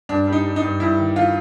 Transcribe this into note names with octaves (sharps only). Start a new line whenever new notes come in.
G2 D4
G3
D#4
G3
D#4
G2
G2 E4
D#3
D#3 F4